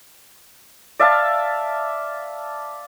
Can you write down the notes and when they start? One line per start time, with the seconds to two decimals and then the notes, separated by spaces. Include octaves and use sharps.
1.00 D5 E5 F5 A5